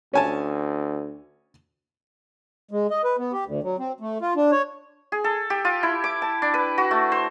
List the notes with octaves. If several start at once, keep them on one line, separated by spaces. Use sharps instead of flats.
D2 C#4 G#5 A5
G#3
D#5
B4
B3
G4
D2
F#3
C4
A3
F4
D4
C#5
G#4
A4
G4
F4
E4
D6
A5
D4
B4
F#4
A3
C5